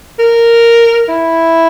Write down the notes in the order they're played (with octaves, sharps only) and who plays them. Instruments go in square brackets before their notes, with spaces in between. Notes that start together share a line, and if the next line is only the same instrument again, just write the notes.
[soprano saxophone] A#4
E4